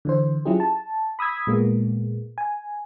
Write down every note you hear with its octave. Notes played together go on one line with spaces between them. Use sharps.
D3 E3 C5
F#3 C#4 E4 F4 G4 G#4
A5
B5 D#6 E6 G#6 B6
A#2 G#3 A#3 B3
G#5